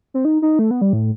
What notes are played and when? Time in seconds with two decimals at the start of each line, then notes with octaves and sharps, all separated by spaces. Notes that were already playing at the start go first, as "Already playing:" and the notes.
0.14 C4
0.25 D#4
0.42 D#4
0.59 A3
0.71 B3
0.81 G3
0.93 A2